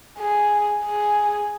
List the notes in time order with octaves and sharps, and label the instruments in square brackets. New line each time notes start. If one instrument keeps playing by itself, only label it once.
[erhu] G#4
G#4